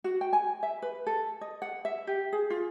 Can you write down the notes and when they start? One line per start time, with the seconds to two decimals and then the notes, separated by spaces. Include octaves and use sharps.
0.04 F#4
0.21 G5
0.33 G#5
0.63 E5
0.82 B4
1.06 A4
1.41 D#5
1.62 F#5
1.85 E5
2.07 G4
2.33 G#4
2.50 F4